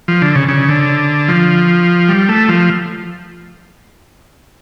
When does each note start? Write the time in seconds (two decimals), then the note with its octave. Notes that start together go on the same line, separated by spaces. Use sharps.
0.08 F3
0.22 D3
0.35 C#3
0.48 C#3
0.69 D3
1.28 F3
2.09 G3
2.29 A3
2.49 F3